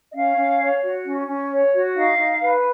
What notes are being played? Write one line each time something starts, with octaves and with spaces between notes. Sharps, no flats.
D#5
C#4 F5
C#4
C#5
F#4
C#4
C#4
C#5
F#4
D#4 F5
D#4
B4